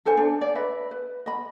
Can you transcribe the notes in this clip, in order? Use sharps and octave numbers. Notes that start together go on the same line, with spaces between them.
D4 A4 C5 G#5
D4
D5
B4 D#5 E5 B5
B4
D#5 B5